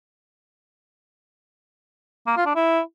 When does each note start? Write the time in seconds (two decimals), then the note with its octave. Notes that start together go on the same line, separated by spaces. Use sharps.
2.27 A#3
2.37 F4
2.46 D4
2.55 E4